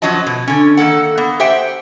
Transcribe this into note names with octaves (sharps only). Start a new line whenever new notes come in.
F2 F3 F#3 C#4 D#5 A5
B2
D3 C#4
D#3 A#3 A4 F#5
A#3 B3
G4 C5 E5 F#5 G5